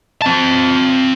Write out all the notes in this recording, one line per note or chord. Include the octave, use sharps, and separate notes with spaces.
C4 A5